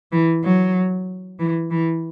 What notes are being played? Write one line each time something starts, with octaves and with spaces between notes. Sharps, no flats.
E3
F#3
E3
E3